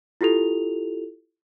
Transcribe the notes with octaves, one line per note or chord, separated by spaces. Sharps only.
E4 F4 G4 A4 F7